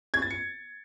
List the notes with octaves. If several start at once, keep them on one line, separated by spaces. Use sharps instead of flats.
G#6
A6
C#7